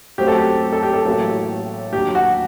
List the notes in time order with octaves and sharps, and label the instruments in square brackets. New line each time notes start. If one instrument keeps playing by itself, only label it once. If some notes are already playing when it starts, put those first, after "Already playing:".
[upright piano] F#2 F#3 A3 C4 F#4 [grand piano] G4
[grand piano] A4
G4
A4
G4
A4
[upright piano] A1 A2 F#3 A#3
[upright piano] D#2 D3 F#3 [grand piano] G4
[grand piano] F#4